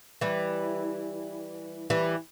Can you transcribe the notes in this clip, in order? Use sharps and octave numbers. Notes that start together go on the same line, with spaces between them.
E3 G3
E3 G3